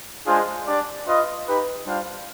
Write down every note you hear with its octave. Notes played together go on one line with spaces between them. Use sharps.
G#3 D4 F4 G#4 C5
D4 G4 D5
F4 B4 D#5
D#4 G4 B4
G3 D4 F4 C5 F5